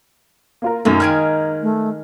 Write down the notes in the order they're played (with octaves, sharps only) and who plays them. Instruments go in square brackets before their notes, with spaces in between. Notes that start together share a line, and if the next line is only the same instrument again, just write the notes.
[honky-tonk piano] A#3 F4 A#4
[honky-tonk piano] F#2 A3 [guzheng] A#3 [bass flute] D#4
[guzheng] D#3 G#3 G#5 [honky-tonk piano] F6 G#6 D7
[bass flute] A3